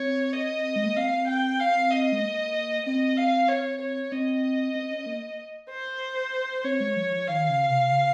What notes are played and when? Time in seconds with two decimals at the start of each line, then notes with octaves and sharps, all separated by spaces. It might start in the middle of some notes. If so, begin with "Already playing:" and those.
Already playing: C4 C#5
0.33 D#5
0.76 G#3
0.86 A#3
0.96 C4 F5
1.28 G5
1.60 F5
1.91 D#5
2.12 G#3
2.23 A#3
2.86 C4 D#5
3.17 F5
3.49 C#5
3.81 C#5
4.12 C4 D#5
4.75 C4
4.91 C#4
5.06 A#3
5.69 C5
6.64 C4 C#5
6.80 G#3
6.96 F3
7.12 F3
7.28 D#3 F5
7.49 C#3
7.70 C3
7.91 C#3